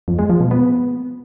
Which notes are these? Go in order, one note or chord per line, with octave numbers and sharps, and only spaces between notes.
F2
G#3
F3
B2
B3